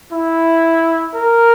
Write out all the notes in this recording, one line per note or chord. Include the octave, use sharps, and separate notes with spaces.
E4
A#4